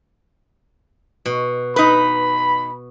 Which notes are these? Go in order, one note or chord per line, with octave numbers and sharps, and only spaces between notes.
B2
D#4 B4 B5